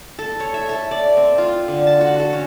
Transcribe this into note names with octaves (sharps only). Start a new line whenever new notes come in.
A4
C#5
E5
A4
D5
C4
F4
D3
A5
F#4
A4
C#4